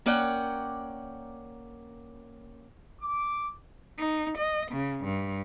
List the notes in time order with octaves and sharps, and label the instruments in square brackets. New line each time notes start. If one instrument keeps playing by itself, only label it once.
[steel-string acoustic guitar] A#3 C#4 D5 F#5 G5
[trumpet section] D6
[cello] D#4
D#5
C#3
G2